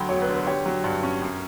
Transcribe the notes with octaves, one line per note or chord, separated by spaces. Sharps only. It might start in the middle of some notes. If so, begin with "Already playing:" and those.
Already playing: D2 F#3 G5 B5
E1 C#5
B4
D3
B4
G4 C#5
F#3
G2
C#4
F#2